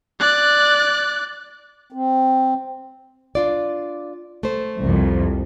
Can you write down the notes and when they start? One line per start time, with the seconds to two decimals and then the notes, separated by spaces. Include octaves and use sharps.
0.19 D5 F#6
1.92 C4
3.35 D4 F4 D5
4.43 A3 C5
4.81 C2 F2